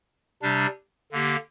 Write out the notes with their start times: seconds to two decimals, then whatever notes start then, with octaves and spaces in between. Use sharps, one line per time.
0.42 C3 G3 D4
1.12 D3 A#3 G4